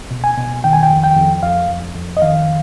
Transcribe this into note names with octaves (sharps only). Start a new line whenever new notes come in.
B2
G#5
B2
D#3 G5
G#5
G5
F2
G5
F2
F2 F5
F2
F2
D#5
D#3 F5